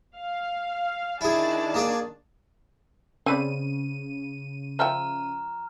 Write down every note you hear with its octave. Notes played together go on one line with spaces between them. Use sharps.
F5
D#3 D4 E4 G#4 A5
A#3 G#4 D5
C#3 C4 B4 D5 D#7
F3 E5 G5 A#5 F6